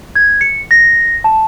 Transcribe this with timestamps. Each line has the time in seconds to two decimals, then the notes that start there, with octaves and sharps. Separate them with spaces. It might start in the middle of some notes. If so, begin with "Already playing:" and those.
0.15 G#6
0.41 C#7
0.71 A#6
1.24 A5